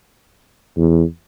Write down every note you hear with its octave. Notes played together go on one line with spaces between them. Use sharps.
E2